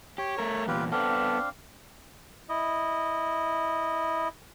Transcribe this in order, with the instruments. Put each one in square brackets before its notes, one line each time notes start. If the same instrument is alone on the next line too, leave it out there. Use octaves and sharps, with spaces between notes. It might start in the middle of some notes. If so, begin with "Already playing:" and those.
[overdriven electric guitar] G4 [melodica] C#5
[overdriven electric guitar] A3 A#4
[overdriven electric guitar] E2 A#2 [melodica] F4 G4 B4
[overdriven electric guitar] B3 A4 [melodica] C4 D4 F5
[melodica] E4 D#5